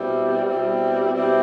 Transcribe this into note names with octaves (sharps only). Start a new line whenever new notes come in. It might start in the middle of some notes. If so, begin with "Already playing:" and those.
Already playing: B2 G3 C4 E4
B2 G3 C4 E4
B2 G3 C4 E4